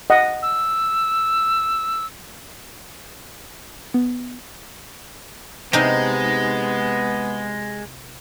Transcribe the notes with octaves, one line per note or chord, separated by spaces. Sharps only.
D#5 F#5
E6
B3
C3 G#3 B3 D#4